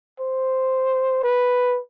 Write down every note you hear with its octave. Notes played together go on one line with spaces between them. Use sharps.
C5
B4